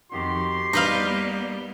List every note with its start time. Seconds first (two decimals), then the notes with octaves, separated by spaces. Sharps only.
0.11 F2 D#3 F#4 G4 C6
0.73 G3 B3 D#4 B4 F5 G6
1.05 A#3